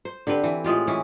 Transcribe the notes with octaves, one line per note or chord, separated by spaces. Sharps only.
C5
D3 C4 G4 B4
E3
A2 G#3 F4 G4
E3 C#4